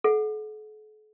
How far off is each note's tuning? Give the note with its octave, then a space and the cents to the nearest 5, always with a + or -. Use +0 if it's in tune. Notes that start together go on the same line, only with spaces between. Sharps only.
A4 -45 F#5 -15